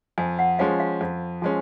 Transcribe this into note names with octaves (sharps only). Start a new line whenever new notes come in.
F2 G#5
F#5
F3 G#3 C#4 F5
F5
F2
F3 G#3 C#4